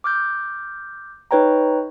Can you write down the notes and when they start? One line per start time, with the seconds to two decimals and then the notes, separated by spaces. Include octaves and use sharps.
0.04 D6 F6 G6
1.31 D#4 B4 C#5 G5 A#5